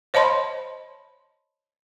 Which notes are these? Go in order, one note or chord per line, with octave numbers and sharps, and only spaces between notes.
C5 C#5 D#5 A5 B5 C6